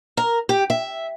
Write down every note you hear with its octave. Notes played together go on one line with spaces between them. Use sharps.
A#4
G4
E5